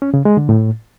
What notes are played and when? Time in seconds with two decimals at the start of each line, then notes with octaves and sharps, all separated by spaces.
0.02 C#4
0.14 C#3
0.25 G#3
0.37 D3
0.49 A2